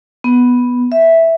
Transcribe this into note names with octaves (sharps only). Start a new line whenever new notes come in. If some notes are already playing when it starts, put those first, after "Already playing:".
B3
E5